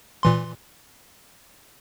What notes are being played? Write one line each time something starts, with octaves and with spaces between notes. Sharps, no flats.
A#2 E3 C6